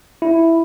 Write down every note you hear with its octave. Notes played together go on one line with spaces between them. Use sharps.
E4